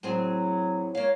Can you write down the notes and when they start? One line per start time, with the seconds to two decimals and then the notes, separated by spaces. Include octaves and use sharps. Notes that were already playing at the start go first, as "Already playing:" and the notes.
0.03 A2 F#3 C4 G#4
0.95 A#3 C#5 F5